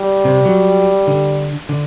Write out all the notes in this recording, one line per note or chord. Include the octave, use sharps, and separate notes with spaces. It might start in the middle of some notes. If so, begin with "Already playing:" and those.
Already playing: G3
C3
F#3
D3
D3